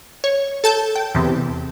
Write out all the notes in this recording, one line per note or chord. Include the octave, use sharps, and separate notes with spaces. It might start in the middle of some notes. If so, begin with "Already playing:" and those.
C#5
A4 A5 G6
G5
E2 C3